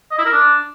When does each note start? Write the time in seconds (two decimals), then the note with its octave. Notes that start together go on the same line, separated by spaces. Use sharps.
0.11 D#5
0.18 E4
0.25 A#4
0.32 D4